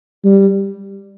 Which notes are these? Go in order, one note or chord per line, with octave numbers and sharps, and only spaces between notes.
G3